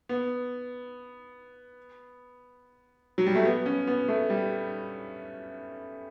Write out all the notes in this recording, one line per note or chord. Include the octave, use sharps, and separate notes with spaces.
B3
F#3
G3
A3
B3
C#4
B3
A3
G3